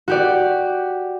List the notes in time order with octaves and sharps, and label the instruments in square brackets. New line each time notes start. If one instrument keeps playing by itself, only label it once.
[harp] F#4 G4 D5